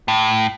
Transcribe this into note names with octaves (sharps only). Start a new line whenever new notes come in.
A2